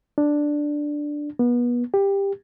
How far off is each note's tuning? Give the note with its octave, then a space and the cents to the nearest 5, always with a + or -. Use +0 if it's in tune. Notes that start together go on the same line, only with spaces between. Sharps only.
D4 +5
B3 -30
G4 +15